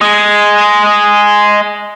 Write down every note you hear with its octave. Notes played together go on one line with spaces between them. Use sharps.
G#3 G#4